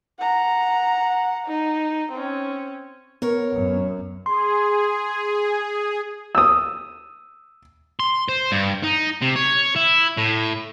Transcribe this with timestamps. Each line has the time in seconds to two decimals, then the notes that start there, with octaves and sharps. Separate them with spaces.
0.20 F#5 A#5
1.47 D#4
2.12 C4 C#4
3.22 B3 A#4 C#5
3.54 F#2
4.26 G#4 C6
6.35 D#6 E6
8.00 C6
8.29 C5
8.52 G2
8.83 D#4
9.22 C3
9.36 C#5
9.76 E4
10.17 A2